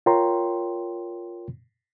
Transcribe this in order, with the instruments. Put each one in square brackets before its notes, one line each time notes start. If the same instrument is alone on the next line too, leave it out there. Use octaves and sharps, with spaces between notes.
[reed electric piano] F4 A#4 C#5 G5 A#5 C6